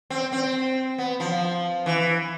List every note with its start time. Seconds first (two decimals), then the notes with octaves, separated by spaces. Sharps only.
0.10 C4
0.33 C4
0.98 B3
1.20 F3
1.86 E3